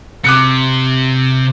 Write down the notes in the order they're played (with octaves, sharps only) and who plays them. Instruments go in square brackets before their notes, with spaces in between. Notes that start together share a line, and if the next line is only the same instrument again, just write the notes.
[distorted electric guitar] C3 [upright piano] D6 F#6 C#7